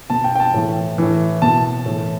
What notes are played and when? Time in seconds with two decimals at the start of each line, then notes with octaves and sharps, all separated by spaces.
0.10 B2 A5
0.24 G5
0.35 G5
0.40 A5
0.54 A2 E3
0.98 A2 E3
1.42 B2 A5
1.86 A2 E3